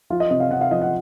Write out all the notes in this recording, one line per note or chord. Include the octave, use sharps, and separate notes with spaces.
F3 F4
D#5
C3 D#5
F5
C3 F#5
F5
F3 D#5
F#5